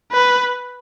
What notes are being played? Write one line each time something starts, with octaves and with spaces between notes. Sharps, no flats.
B4